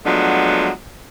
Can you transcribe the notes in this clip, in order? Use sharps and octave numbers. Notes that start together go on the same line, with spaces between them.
F3 F#3 G#3 A3 B3 D4